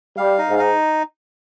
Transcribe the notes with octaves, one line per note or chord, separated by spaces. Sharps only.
G3 F5
D#4
G#2
D#4